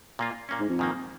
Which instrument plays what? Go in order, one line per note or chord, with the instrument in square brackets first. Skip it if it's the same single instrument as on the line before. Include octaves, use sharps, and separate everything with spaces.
[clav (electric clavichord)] A#2 A#3 F4
A#2 A#3 C#4
[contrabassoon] G#2
F2
[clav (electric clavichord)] G#2 D#3 A#3